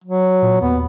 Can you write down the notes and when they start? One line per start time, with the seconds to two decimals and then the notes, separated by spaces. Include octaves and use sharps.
0.04 F#3
0.42 A#2
0.61 D#2 B3